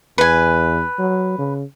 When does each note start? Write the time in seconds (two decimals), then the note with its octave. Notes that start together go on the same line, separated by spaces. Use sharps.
0.18 E2 B4 G#5
0.99 F#3
1.38 C#3